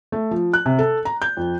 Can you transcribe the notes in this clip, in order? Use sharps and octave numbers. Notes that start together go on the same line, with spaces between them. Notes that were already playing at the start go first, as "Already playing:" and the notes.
A3
F3
F#6
C3
A4
A#5
G6
F2